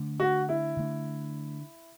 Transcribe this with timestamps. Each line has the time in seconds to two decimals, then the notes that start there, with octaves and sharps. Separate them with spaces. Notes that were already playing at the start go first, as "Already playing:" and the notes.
Already playing: D3 A3 D4
0.20 F#4
0.49 E4
0.77 D3 A3 D4